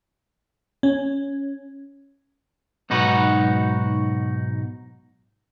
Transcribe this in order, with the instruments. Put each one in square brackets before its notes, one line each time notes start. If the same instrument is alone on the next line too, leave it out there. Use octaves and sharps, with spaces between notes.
[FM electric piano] C#4
[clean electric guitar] B1 G#2 D#4 F#4 B4